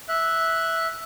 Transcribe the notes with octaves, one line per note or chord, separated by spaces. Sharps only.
E5 F#6